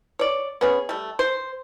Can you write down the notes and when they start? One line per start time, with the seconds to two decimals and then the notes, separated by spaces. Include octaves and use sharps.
0.19 C#5 D5
0.61 B3 C#4 G#4
0.89 G3 A3
1.19 C5